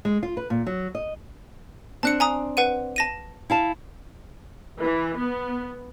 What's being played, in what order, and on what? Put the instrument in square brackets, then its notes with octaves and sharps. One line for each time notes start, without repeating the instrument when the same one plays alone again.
[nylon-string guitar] G#3
F4
B4
A#2
F#3
D#5
[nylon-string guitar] C4 D4 [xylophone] A5 F#6 C#7
[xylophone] G#5 A#5 D#6
B4 F#5 D#7
A5 A#6 D#7
[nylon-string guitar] E4 F5 A5
[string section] E3
B3